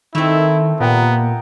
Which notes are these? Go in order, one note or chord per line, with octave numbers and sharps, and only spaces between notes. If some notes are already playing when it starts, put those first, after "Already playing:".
D#3 A3 C4 E4
A#2 B3 F#5 G5 A#5